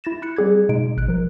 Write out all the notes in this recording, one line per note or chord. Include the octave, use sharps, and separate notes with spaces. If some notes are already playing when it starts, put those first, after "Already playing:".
E4 A6 A#6 E7
B5 F#6 C#7
G3 C4 G#4 D6 G#6
B2 G#3 D#4 D7
G#1 F#6 D7
F3 A#4